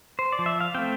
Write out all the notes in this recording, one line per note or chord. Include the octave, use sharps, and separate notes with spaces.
C5
D5
F3
E5
F5
A3 C4 G5